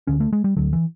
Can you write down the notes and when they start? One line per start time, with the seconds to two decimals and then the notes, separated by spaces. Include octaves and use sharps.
0.07 D2 D3 C#4
0.20 A3
0.33 G#3
0.44 G3
0.56 D2 D3 F#3
0.73 E3